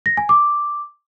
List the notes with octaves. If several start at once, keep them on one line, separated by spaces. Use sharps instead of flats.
A#6
G#5
D6